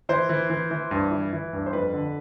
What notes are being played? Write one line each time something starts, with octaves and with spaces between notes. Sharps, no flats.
E3 C5
E3
E3
E3
G2
E3
E3
G2
C5
F2 B4
D3